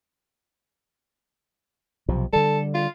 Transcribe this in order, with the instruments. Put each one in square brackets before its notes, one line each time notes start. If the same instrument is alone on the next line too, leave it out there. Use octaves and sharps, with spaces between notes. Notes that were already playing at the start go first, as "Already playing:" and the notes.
[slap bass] B1 C3 F3
[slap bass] D3 G3 [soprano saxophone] A4
[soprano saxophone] F4